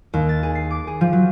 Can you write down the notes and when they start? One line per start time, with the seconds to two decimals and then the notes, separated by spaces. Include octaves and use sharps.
0.14 D#2
0.29 A6
0.43 G#4
0.55 C7
0.71 D6
0.87 G#4
1.01 F3
1.13 F#3